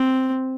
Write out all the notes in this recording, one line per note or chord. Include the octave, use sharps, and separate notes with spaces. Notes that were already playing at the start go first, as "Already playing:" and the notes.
Already playing: C4